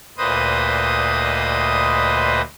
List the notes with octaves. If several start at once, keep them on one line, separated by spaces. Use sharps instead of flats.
D2 A#2 B4 C5 D#5 D#6